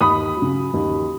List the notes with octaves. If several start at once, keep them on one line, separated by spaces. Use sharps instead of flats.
D#2 B5 D#6
F#3
C#3
D#2